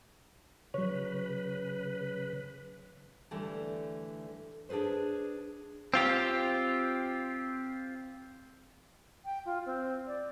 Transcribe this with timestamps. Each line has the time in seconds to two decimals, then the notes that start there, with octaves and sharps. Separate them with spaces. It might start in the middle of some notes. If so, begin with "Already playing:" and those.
0.74 C#3 F#3 B4 C#5
3.31 D3 E3 G3 A3
4.69 D4 G#4 A4 B4 C5
5.94 C4 F4 G4
9.25 G5
9.46 F4
9.66 C4
10.07 D5